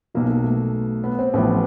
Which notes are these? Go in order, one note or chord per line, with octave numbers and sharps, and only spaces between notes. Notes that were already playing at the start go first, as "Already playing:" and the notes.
B1 B2 A#3
A#3
A3
B3
C4
A1 A2 F3 B3